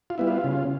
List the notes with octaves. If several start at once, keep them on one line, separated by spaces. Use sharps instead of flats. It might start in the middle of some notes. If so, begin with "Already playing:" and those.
F4
G3 B3 E4
F4
C#3